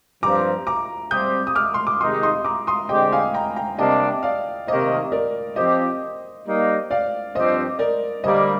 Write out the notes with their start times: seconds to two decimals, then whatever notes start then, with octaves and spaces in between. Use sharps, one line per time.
0.23 G2 F3 C4 A#5 D6
0.67 A#5 D6
1.11 G3 C4 G4 D#6 G6
1.47 D#6
1.55 D6 F6
1.74 C6
1.87 D6
2.00 C3 D#3 G#3 D#4 G4 C6 D#6
2.23 C6 D#6
2.45 A#5 D6
2.67 C6 D#6
2.89 D3 G#3 C4 G4 D#5 G5
3.12 F5 G#5
3.34 G5 A#5
3.56 G5 A#5
3.78 C3 G3 A#3 D4 D#5 G5
4.23 D5 F5
4.67 C3 D#3 A#3 C5 D#5
5.12 A#4 D5
5.56 F3 C4 G4 C5 D#5
6.45 G3 A#3 D#4
6.91 D5 F5
7.35 G2 F3 C4 G4 C5 D#5
7.79 A#4 D5
8.24 D3 G3 A#3 C5 D#5